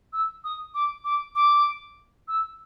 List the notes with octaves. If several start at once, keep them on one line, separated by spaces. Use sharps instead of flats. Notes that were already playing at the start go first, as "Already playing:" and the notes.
E6
D#6
D6
D6
D6
E6